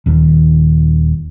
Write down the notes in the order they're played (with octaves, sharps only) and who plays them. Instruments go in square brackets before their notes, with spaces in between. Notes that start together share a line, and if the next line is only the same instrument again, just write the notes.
[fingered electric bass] D#1 D#2